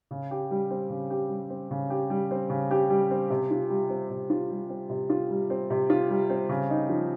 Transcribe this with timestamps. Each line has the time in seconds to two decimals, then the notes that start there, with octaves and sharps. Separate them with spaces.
0.11 C#3
0.31 G4
0.51 G3
0.70 C4
0.90 C#3
1.10 G4
1.30 G3
1.50 C4
1.71 C#3
1.90 G4
2.10 G3
2.31 C4
2.50 C#3
2.71 G4
2.90 G3
3.11 C4
3.30 C3
3.51 F4
3.70 G3
3.90 C4
4.10 C3
4.30 F4
4.50 G3
4.70 C4
4.90 C3
5.10 F4
5.31 G3
5.50 C4
5.70 C3
5.90 F4
6.10 G3
6.30 C4
6.49 C#3
6.70 D#4
6.89 F3